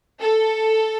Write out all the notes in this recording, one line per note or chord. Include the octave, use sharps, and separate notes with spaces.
A4